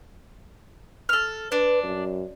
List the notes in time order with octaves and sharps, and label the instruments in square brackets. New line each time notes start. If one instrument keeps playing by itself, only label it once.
[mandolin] A4 F6
[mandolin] D4 [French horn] B4
[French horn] F#2